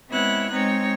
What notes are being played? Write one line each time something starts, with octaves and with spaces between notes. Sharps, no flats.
G#3 B3 C4 E4 C#5 F#6
G#3 C4 D#4 C#5